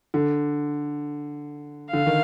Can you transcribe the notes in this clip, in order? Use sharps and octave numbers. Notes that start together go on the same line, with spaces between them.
D3
D3 F5
D#3